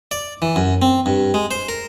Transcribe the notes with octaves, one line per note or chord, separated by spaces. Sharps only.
D5
E3
F#2
C4
G2
G#3
C5
A#4